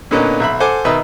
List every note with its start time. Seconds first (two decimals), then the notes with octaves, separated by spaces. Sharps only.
0.11 A#2 D3 A#3 B3 C#4 D#4
0.40 B1 E5 B5
0.60 A4 C5 F#5 G#5 D6
0.85 B2 D#3 D#4 B4 E5 E6